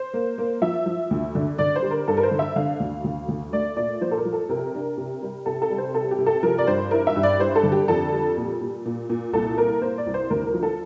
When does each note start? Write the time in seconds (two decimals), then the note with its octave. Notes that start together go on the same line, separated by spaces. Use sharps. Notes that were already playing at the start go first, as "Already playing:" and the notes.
Already playing: C5
0.14 A#3
0.38 A#3
0.62 F3 E5
0.86 F3
1.11 D2
1.35 D3
1.58 D3 D5
1.76 C5
1.82 G3
1.91 A#4
2.08 G2 A4
2.17 A#4
2.23 C5
2.31 D3
2.39 E5
2.56 D3 F5
2.80 D2
3.04 D2
3.28 D2
3.53 A3 D5
3.77 A#2 D5
4.01 F3 C5
4.11 A4
4.17 A#4
4.25 F3
4.33 A4
4.49 C3 A#4
4.74 D4
4.98 C3
5.22 G3
5.46 C3 A4
5.62 A4
5.70 G3
5.78 C5
5.94 C3 A4
6.11 G4
6.18 C3
6.26 A4
6.43 F3 A#4
6.58 D5
6.67 G2 C5
6.91 E4 A#4
7.07 E5
7.16 G2
7.23 D5
7.39 G3 C5
7.56 A4
7.63 D3
7.72 G4
7.88 F2 A4
8.12 G3
8.37 A#2
8.61 A#2
8.85 A#2
9.10 A#2
9.33 C2 A4
9.58 A#3 A#4
9.82 A#3 C5
9.98 D5
10.07 C2
10.14 C5
10.30 D2 A#4
10.46 A#4
10.54 F3
10.63 A4